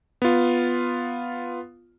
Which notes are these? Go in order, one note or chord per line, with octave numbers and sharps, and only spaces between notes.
B3 F4